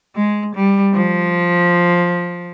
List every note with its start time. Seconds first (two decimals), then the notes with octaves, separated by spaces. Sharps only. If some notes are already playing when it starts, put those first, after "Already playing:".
0.15 G#3
0.54 G3
0.94 F3